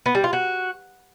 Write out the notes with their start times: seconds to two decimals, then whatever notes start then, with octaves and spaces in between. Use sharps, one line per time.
0.06 B3
0.15 G3
0.24 F4
0.33 F#4